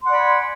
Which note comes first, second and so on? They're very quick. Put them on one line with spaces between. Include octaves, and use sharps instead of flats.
C6 F#5 D5 B5 G#5